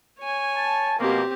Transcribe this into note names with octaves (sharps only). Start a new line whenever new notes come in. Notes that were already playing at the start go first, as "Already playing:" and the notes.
C#5 G#5
A5
B2 F3 A#3 C4 G4